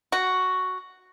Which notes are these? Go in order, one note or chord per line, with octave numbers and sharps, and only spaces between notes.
F#4